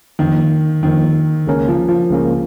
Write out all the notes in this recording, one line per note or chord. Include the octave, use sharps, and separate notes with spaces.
F2 D#3 F3 A#3
F2 D#3 F3 A#3
C#2 C#3 A#3 C#4 A#4
F3
F3
C#2 C#3 A#3 C#4 A#4